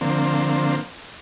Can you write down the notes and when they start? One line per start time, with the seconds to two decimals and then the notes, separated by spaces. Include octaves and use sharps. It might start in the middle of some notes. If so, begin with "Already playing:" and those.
0.01 D3 F3 A#3 C4